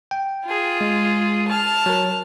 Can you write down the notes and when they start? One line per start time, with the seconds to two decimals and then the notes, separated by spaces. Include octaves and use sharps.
0.11 G5
0.45 F4 G#4
0.81 G#3
1.49 A5 F6
1.86 F#3 A#4